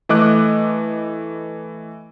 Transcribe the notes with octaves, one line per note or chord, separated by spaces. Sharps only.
E3 A3 D#5 D6 F#6